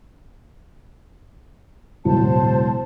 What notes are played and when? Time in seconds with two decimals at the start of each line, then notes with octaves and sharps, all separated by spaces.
2.05 E1 A2 C#3 F#3 G#3 E4 C5 A5